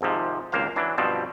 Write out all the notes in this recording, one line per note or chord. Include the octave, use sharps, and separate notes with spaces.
G#1 G#2 C3 F3
G#1 C#2 A#3 C5 F5
E3 F#3 D4
G2 B2 F3 C4 A5